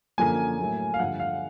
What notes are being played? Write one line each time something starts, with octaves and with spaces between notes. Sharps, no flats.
F#2 D3 F3 A#3 G#5
A2 F#3 A#3
F5
G2 D3 F3 F#5
F5